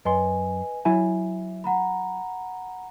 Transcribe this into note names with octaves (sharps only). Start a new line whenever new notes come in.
F#2 B4 D#5 G#5 C6
F#3 E4 E5 G#5
F#5 A#5 B5